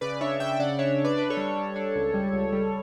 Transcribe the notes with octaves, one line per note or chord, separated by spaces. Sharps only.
C#3 B4 D5
D4 C#5 E5
C#3 E5 G5
C#3 D5 F#5
D4 C#5 E5
D4
B4 D5
D4 B4
A4 C#5
G3
G3
D4
C#2
G3
C#2
G3